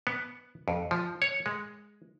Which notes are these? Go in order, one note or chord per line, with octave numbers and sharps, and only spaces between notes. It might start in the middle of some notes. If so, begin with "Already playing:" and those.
B3
F2
F3
C#5
G#3